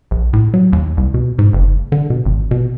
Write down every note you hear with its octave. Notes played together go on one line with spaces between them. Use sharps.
A#1
A2
F#3
D#2
C2
B2
G#2
F#1
D3
B2
G#1
B2